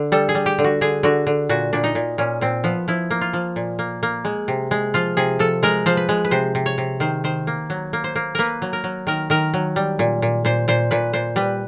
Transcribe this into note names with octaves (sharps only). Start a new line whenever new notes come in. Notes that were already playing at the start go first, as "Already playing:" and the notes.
Already playing: D3
G3 A4
G#4
G3
G4
D3
F#4
D3 G#4
D3 F#4
D3
A#2 F#4
A#2 D4
D#4
A#2
A#2 C#4
A#2 C4
F3 B3
F3 E4
A#3
F4
F3
A#2
A#3
A#3
G#3
C3
G#3
F3 F4
C3 G#4
F3 A4
G#3 A#4
F3 C5
B4
G#3
B4
C3 C5
C3
C#5
C3
D#3 C5
D#3 C5
A#3
F#3
A#3
C5
A#3
A#3 A#4 B4
F#3
A#4
F#3
D#3 A#4
D#3 A#4
F#3
G3
A#2
A#2
A#2 C5
A#2 C5
A#2 B4
A#2 C5
G3 B4